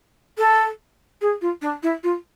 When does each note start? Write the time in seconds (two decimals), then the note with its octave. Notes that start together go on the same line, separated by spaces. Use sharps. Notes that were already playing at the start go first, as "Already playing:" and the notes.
0.38 A4
1.21 G#4
1.41 F4
1.62 D4
1.83 E4
2.03 F4